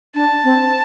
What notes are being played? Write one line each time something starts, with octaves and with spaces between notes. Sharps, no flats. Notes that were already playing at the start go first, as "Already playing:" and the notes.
D4 A5
C4